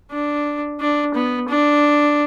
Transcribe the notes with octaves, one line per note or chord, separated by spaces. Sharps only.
D4
D4
B3
D4